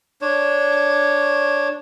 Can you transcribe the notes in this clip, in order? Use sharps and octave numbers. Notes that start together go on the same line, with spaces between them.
D4 C#5